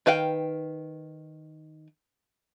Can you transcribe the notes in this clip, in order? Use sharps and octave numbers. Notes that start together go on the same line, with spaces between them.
D#3 B4 F5 G5